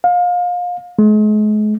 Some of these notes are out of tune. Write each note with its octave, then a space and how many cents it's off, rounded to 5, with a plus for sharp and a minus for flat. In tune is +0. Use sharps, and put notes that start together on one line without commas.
F5 +30
G#3 +40